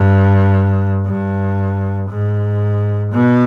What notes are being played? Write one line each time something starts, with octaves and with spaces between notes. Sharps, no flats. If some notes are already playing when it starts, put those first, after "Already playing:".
Already playing: G2
G2
G#2
B2